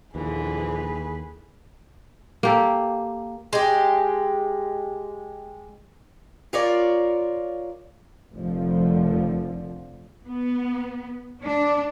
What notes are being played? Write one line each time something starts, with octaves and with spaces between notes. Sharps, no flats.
A#1 D#2 D3 E3 G#4 B4
A#3 G4 A4
G#3 G4
F4 A#4 C#5 D5
F1 D3 F3
B3
D4